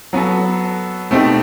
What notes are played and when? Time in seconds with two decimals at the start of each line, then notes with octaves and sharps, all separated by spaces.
0.13 F#3 B3 F#4 A4
1.10 B2 A3 C4 D#4 G4